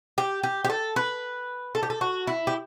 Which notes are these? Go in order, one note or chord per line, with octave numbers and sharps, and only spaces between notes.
G4
G4
G4
A4
B4
A4
G4
A4
F#4
E4
G4